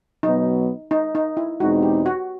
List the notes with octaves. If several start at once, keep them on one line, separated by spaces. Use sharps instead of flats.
B2 F#3 B3 D#4
D#4
D#4
E4
E2 B2 G#3 C4 D#4 F#4
G4
F#4